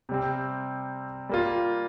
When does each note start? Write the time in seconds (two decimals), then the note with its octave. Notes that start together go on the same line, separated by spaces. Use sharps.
0.09 C3 G3 C4
1.29 G3 A#3 F4